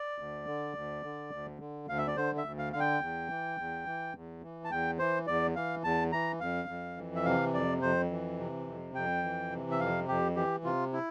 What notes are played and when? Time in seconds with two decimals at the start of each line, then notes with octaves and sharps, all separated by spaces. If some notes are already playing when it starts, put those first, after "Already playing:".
Already playing: D5
0.18 D2
0.46 D3
0.75 D2
1.03 D3
1.32 D2
1.60 D3
1.88 D2 F5
1.98 E5
2.07 D5
2.16 D3 C5
2.38 E5
2.45 D2
2.58 F5
2.73 D3 F5
2.80 G5
3.01 E2
3.29 E3
3.58 E2
3.86 E3
4.15 E2
4.42 E3
4.64 A5
4.71 E2 G5
4.99 E3 C5
5.27 E2 D5
5.56 E3 F5
5.84 E2 A5
6.12 E3 A#5
6.40 F2 F5
6.69 F2
6.97 E3
7.15 E5
7.25 C3 F5
7.54 F2 D5
7.82 F2 C5
8.11 E3
8.39 C3
8.67 F2
8.94 F2 G5
9.23 E3
9.51 C3
9.71 E5
9.80 F2 F5
10.08 F2 G4
10.36 E3 G4
10.64 C3 F4
10.93 E4